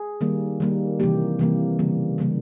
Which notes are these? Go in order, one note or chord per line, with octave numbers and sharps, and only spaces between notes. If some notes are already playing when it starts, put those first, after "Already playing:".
Already playing: G#4
D#3 G3 A#3
D#3 G3 A#3
C3 E3 G3 A#3 G4
C3 E3 G3 A#3
C#3 E3 G3 A#3
C#3 E3 G3 A#3